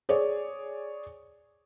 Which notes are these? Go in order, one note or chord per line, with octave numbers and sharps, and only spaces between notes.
G#4 C#5 D5